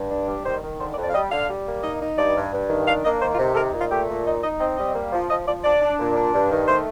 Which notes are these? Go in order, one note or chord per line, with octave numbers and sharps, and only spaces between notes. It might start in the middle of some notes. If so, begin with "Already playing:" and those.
Already playing: G2
D4
G3
D#3 C5
D#3
D3 C5
D5
F2
D5
F5
G3 D#5
D3 F5
G3
A#3
D#4 D#5
D#4
G2 D5
G2
G2
D#3
D4 F5
A#3 D#5
D#3 C5
F4
C3
A4
D#4 A#4
A#2
F4
A3 G4
A#2
D#4 D#5
D#4 D#5
C4 D#5
G3 D#5
A#3
F3
F3 D#5
F3 D5
D4 D5
D4
A#2
D4
G2
D#3
A3 C5